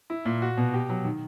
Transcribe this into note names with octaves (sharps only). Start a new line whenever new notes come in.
E4
A#2
F#4
B2
G4
F#3
D#3